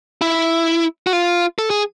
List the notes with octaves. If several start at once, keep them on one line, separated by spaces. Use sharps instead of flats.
E4
F#4
F4
A4
G#4